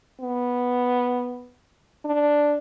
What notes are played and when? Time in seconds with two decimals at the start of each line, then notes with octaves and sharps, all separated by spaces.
0.20 B3
2.05 D4